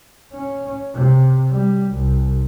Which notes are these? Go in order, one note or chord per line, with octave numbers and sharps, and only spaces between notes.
C#4
C3
G3
C2